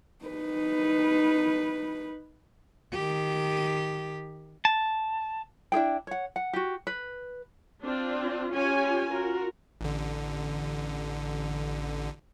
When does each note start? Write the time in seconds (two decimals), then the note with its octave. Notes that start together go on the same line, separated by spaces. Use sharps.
0.25 D#4 B4
2.93 D#3 G4
4.65 A5
5.72 D4 E4 G#4 G5
6.07 C#5 F#5
6.36 F#5
6.53 F#4 G4
6.87 B4
7.84 C4 D4 F4
8.53 C#4 F4 G4 C#5 G#5
9.13 F4 F#4 A#4
9.81 A1 D3